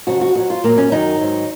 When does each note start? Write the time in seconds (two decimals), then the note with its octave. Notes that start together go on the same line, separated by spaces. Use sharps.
0.07 F2 C#3 F#3 F#4
0.21 F#4
0.35 F2 D#3 F#3 F#4
0.50 F4
0.64 A#2 F#3 A#3
0.78 C#4
0.92 F#2 D#3 F#3 D#4
1.20 G#2 D#3 F#3